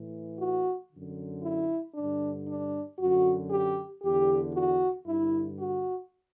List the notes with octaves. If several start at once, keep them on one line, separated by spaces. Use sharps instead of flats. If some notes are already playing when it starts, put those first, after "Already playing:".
Already playing: A2 E3
F#4
D3
F#2
E4
G2 D3 D4
D4
F#2 D3 F#4
G4
E2 D3 G4
F#4
G2 D3 E4
F#4